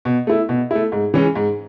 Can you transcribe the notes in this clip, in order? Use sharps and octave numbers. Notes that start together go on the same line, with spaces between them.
B2
A3 E4
B2
A3 E4
G#2
E3 G#3 C#4
G#2